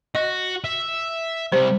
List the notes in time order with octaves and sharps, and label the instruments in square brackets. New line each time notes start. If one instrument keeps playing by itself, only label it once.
[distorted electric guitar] F#4 [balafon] D#5
[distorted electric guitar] E5
[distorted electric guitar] C3 G3 [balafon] C5